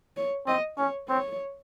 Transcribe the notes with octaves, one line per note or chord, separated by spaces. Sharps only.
C#5
C4 D#5
C#4 C#5
C4 C#5